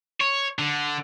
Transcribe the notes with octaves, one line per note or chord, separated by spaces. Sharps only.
C#5
D3